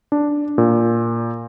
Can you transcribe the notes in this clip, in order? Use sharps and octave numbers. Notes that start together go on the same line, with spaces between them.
D4
A#2